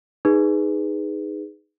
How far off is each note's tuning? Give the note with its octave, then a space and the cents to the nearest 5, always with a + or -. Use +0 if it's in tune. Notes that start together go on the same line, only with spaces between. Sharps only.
D#4 +0 G#4 -15 B4 +0